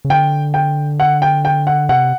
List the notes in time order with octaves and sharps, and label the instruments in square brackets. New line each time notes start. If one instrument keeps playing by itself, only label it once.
[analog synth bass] C#3
[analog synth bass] D3 [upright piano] G5
[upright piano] G5
F#5
G5
G5
F#5
[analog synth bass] C3 [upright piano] F#5